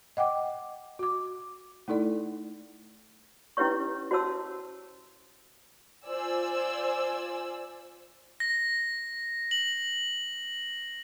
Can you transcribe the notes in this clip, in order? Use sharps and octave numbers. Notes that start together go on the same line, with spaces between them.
D#5 F#5 G5 D6
F#4 D6
A3 D#4 E4 A4 D5
C#4 E4 G4 B4 C#5 C#6
F#4 C5 C#5 A5 E6
F4 C5 D5 G#5 E6
A#6
F#7